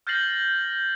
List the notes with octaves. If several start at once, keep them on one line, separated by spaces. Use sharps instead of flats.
F6 G6 A6 A#6 C7 F#7